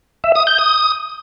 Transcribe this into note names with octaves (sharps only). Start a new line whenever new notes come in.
E5
D#6
G6
D#6